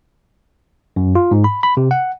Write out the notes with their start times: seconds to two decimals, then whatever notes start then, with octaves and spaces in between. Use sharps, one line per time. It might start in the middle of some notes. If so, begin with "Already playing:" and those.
0.96 F#2
1.15 F4
1.31 G#2
1.44 B5
1.63 B5
1.77 C3
1.91 F#5